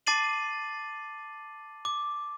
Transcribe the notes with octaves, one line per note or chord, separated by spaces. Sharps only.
A5 D6 A6 C7 D#7 F#7
D6